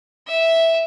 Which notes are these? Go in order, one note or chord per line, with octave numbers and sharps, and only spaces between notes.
E5